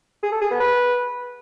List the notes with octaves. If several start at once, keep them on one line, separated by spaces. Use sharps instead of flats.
G#4
A4
G#4
B3
B4